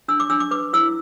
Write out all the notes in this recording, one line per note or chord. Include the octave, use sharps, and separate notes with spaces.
D4 E6
D6
D4 E6
D6
B4 D6
E4 E6